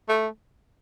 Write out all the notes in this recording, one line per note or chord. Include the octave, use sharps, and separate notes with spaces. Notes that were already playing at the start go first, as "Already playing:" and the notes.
A3